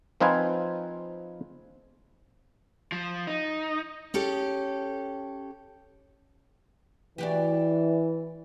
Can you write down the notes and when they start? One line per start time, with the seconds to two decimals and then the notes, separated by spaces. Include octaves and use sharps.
0.20 F3 C4 D#4 F4 B4 G#5
2.92 F3
3.27 D#4
4.14 C#4 G4 A4
7.18 E3 D4 F#4 G4